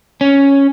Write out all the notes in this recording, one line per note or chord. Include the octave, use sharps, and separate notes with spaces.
C#4